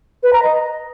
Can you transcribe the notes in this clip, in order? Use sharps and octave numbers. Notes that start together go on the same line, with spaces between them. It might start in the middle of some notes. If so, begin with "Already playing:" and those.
B4
A#5
D#5